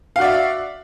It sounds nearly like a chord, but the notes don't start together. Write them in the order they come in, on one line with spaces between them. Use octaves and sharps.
F5 F#4 D5 E5